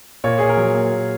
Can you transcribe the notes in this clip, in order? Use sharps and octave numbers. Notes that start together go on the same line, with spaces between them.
A#2 C#5
A#2 G#4
A#4
F#3
A#3
A#2